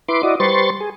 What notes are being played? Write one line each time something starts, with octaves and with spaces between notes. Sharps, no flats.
E4 B4 C6 D6
E4 F#4 D5 D#5
G3 B4 C5 C6 C#6 A6
G#4